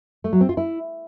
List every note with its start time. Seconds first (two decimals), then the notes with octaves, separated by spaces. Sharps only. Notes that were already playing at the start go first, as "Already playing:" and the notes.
0.24 A3
0.33 F#3
0.41 C4
0.49 F4
0.57 E4